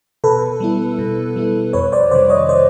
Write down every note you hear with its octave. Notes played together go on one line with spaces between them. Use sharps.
B2 A4 B4
G3 B3 E4
B2
G3 B3 E4
F2 B4 C#5
C5 D5
C3 D#3 G3 C5 D5
C#5 D#5
C5 D5